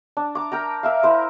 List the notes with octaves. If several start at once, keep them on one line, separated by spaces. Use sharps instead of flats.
D4
A#5 D6
A#4 G5 A#5
A#4 E5 F5
E4 A#4 C5